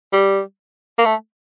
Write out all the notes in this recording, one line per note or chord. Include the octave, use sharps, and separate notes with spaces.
G3
A#3
A3